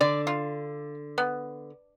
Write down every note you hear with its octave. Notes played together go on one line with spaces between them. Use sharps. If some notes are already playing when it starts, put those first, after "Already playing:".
D3 D5
F4
B3